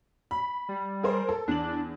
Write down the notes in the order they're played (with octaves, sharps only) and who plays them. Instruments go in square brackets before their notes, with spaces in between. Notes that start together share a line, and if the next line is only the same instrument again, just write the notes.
[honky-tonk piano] B5
[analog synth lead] G3
[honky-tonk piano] G#4 A#4 C5
A4
[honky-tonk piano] E2 F#7 [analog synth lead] D4